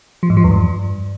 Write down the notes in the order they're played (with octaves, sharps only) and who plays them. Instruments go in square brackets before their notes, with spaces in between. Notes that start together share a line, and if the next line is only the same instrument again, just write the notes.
[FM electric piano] F3
G#2
F3
E2
G2